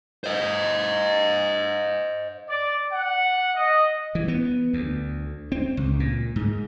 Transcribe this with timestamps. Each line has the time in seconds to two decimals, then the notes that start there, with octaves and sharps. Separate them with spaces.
0.24 C5 D#5
2.49 D5
2.93 F#5
3.55 D#5
4.15 E3
4.28 B3
4.73 D2
5.52 C4
5.77 C#2
6.00 A#2
6.36 G#2